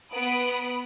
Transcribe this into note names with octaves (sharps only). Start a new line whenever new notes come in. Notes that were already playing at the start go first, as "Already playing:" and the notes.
B3 B5 D#6 D7